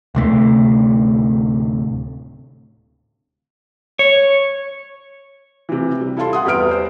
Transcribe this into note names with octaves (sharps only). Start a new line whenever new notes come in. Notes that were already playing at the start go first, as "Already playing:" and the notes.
D1 C3 A3
C#5
C3 E3
G3
E4 A4 F5 A5 C6
F#5 C6 D#6
E2 G3 B4 E5 F6 D7
C5